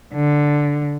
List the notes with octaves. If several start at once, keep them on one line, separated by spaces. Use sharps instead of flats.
D3